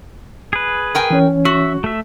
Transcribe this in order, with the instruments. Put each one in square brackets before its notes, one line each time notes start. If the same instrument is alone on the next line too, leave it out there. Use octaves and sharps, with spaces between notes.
[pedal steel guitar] G#4 B4
[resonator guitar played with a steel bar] A#4 G5 G#5
[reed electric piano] E3 C#4 C#5
[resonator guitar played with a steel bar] F#4 [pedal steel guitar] E5
[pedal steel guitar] A3 E5